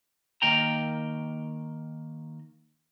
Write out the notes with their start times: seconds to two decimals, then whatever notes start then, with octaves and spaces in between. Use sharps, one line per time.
0.42 D#3 A#3 G5 A#5